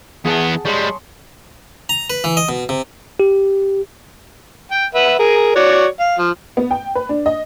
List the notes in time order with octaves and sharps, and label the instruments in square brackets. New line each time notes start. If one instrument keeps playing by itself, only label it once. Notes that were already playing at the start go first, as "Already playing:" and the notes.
[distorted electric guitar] E2 B3 [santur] G#4 F#5 A5
[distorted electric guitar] G3 G#3 [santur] C#5 C6
[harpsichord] A#5
B4
E3
D#5
B2
C3
[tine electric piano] G4
[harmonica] G5
B4 E5 F#5
G#4 A#4
F#4 C#5 D5
F5
F3
[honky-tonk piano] B3
G5
B4
D4
D#5